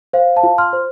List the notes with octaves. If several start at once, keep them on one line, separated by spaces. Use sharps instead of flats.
C5 F5
F5 A5
F4
C6 F6
C5